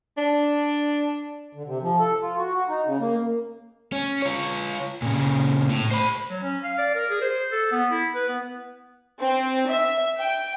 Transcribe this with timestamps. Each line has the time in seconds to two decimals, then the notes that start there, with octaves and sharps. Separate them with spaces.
0.17 D4
1.53 D3
1.66 C3
1.82 F3
2.00 A4
2.22 F4
2.38 F#4
2.54 F#4
2.68 D#4
2.86 C#3
3.00 A#3
3.92 C#4
4.22 F4 C#5
5.02 A#2 C#3
5.70 A2
5.91 C5 B5
6.30 F#3
6.43 C#4
6.64 F5
6.78 D5
6.95 A#4
7.10 G#4
7.21 C5
7.52 A4
7.72 B3
7.91 E4
8.15 B4
8.29 B3
9.19 C4
9.68 E5
10.18 G5